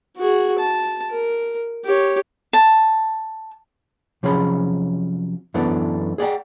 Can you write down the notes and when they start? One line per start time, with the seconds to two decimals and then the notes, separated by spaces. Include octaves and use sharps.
0.17 F#4 G#4
0.59 A5
1.10 A#4
1.85 G4 C#5
2.53 A5
4.23 C3 F3 F#3 C#4 G#4 B5
5.54 F#2 E3 A3 B3 D4
6.18 G#4 D5 F#5 G5